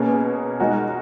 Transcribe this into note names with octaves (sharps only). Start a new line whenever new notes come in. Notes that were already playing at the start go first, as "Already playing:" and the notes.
Already playing: B2 A#3 C#4 G#4
G#3 D#4 F#4 A#4